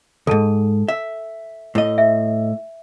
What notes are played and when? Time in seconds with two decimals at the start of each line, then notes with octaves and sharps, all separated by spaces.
0.27 D2 G#2 A4 A5
0.88 E5
1.75 A2 D#5
1.98 E5